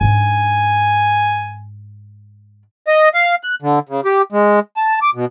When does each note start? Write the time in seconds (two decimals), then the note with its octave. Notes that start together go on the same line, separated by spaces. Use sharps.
0.01 G#2 D4 G#5
2.88 D#5
3.14 F5
3.44 F#6
3.62 D3
3.89 C#3
4.05 G4
4.32 G#3
4.77 A5
5.02 D6
5.15 B2